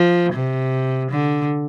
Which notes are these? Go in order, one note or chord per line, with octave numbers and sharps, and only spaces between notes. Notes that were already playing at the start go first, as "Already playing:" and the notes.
Already playing: F3
C3
D3